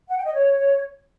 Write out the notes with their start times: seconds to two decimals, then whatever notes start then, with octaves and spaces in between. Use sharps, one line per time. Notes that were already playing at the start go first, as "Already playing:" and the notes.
0.09 F#5
0.18 G5
0.26 D#5
0.34 C#5